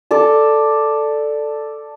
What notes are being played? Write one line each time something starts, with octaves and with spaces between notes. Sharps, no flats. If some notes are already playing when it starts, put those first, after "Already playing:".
A4 D5 A5